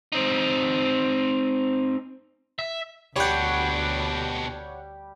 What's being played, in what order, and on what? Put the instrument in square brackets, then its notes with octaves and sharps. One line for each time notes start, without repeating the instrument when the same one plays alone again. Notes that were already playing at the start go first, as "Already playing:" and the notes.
[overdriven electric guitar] C4 D#4
E5
[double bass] D2 [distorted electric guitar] B2 D4 [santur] G3 G5 [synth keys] C#5 F#5